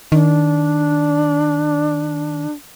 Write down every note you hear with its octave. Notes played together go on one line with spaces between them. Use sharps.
D#3 D4